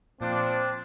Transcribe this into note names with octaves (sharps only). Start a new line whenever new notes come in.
A#2 F3 C4 D4